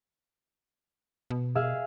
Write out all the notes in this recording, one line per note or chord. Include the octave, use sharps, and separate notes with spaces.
B2
G#4 E5 F5